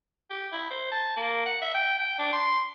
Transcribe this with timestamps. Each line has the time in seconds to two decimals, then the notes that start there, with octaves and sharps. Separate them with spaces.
0.30 G4
0.52 E4
0.71 C5
0.92 A5
1.17 A#3
1.46 F#5
1.62 E5
1.74 G5
1.99 G5
2.19 D4
2.33 C6